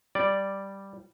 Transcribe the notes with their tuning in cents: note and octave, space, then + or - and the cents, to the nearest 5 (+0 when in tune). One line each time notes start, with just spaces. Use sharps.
G3 +0 D5 +0